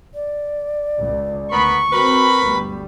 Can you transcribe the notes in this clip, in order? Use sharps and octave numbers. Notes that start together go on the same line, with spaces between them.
D5
C#2
D2 B3 A#4 B5 C#6
C4 F#4 A#4 B4 B5
D2 G2 G3 B3